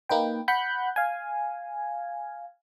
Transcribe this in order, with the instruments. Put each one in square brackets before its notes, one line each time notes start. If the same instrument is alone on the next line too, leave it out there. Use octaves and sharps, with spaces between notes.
[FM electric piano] A#3 D#4 B4 G5
F#5 B5 F#6 G6
F5 G#5